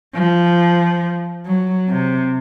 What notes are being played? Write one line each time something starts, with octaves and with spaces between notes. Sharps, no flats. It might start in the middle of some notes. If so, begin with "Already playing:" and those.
F3
F#3
C3